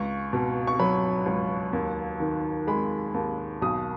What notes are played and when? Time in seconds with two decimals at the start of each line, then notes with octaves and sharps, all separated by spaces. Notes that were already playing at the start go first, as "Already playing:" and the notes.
Already playing: C#2 C#6
0.33 B2
0.67 C#6
0.80 F#3 B5
1.26 C#2
1.73 D#2
2.20 D#3
2.67 G#3 B5
3.14 D#2
3.62 B1 D#6